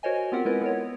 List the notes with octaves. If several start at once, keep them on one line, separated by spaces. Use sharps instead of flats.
F#4 A#4 C5 C#5 D#5 G#5
B3 C4 F4 G4 A#4 F#5
G#3 C4 E4 F4 A#4 B4
B3 A#4 C#5